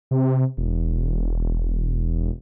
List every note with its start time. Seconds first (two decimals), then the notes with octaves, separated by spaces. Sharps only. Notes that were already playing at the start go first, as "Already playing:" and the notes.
0.11 C3
0.57 E1